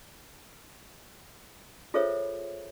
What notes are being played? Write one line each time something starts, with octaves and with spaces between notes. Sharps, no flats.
F4 G#4 A4 C5 C#5 E5